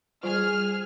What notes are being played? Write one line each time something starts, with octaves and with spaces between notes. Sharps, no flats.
G3 F4 G#4 C5 F6